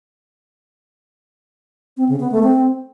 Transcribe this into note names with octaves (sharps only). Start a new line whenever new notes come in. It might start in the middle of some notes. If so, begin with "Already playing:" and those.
C4
C#3
B3
A3
C4